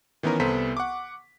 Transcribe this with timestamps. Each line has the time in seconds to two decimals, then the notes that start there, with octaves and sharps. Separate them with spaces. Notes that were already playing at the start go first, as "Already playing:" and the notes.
0.23 D#3 E3 B3 C#4 A#4
0.40 C2 B3 A4 C5 A#5 B6
0.77 F#5 C#6 D6